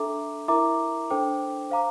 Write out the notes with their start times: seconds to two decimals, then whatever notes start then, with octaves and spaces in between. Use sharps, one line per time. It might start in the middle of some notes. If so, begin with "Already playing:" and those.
Already playing: D4 A4 E5 A#5 D6
0.48 E4 A#4 E5 A#5 D6
1.10 D4 A4 C5 G5 D6
1.70 C5 F5 A#5 D6